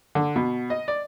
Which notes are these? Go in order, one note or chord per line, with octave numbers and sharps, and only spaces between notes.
D3
B2
D#5
D5